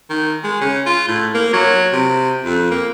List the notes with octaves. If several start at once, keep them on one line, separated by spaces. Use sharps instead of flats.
D#3
G#3
C#3
F4
A2
A#3
F#3
C3
F2
A#3